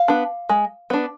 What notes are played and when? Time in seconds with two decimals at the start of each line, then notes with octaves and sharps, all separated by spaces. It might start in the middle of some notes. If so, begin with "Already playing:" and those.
Already playing: F5
0.08 B3 D4
0.49 G#3
0.90 B3 D4